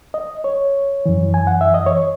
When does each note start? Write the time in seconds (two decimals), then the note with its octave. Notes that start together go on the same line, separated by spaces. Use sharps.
0.14 D#5
0.44 C#5
1.06 F#2 E3
1.34 G#5
1.47 F#5
1.61 E5
1.74 D#5
1.86 C#5